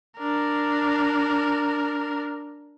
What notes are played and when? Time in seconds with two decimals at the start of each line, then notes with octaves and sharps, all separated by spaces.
0.19 D4 A#4